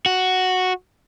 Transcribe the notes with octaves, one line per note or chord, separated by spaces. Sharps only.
F#4